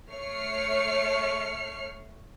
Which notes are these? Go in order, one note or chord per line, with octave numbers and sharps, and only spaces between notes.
A3 C#5 F6 C7 C#7